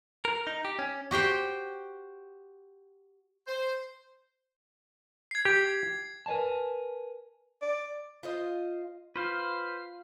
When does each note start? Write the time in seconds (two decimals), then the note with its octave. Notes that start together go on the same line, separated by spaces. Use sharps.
0.25 A#4
0.47 D#4
0.65 G4
0.79 C#4
1.11 F#4 G4 C5 G5
3.47 C5
5.31 G#6 C7
5.45 G4
6.26 A#4 B4 D5 G#5 A5
7.62 D5
8.23 F4 C5 D#5
9.16 F4 B4 C5 F5 F6